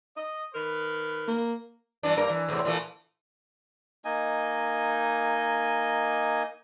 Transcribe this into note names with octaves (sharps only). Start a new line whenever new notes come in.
D#5
D#3 A#4 B4
A#3
G2 E3 D4
G2 A#3 A#4
E3
E2 A2 C3
A#2 E3 A3
A#3 D#4 D#5 G#5